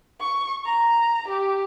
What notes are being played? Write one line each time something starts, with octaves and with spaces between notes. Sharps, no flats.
C#6
A#5
G4